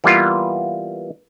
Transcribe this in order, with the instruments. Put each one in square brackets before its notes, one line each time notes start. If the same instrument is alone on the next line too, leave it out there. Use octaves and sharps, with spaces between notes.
[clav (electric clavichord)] E3 G3 A#3 B3 F4